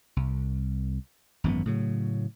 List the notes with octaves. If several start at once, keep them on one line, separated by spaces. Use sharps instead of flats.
C2
G#1 F#2 E3 B3
A2 C#3 F#3